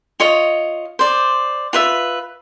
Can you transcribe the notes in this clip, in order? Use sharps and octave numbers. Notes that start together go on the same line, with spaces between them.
F4 C#5 D#5
C5 D5
F4 B4 E5